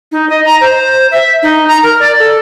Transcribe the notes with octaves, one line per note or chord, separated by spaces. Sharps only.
D#4
D#5
A#5
C5
E5
D#4
A#5
A#4
D5
A4